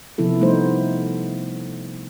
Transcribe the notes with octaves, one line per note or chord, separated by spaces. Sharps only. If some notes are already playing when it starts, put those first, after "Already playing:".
C3 F3 B3 E4 A4
F3 G3 A3 B3 D#4 C5